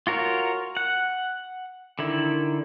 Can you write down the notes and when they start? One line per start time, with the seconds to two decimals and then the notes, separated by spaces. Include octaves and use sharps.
0.07 F4 F#4 A#4 C#5
0.77 F#5
1.99 D3 D#3 E4